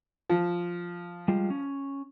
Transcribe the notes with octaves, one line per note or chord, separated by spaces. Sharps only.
F3
G3 G#3 F4
C#4